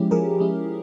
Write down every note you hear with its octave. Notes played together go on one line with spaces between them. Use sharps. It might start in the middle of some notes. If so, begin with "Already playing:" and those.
Already playing: F3 G#3 C#4 E4 G4
F3 G#4 A#4
G#3 C#4 E4